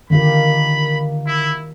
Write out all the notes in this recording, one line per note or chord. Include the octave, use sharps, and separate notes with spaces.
D3 D#3 A#3 G4 B5
E4